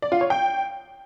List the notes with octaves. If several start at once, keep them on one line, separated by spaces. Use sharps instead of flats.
D5
F4
C#5
G5